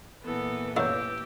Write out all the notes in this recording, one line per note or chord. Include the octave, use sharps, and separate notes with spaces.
A#2 E3 B3 A4
A1 F#2 F#3 G4 E6 G6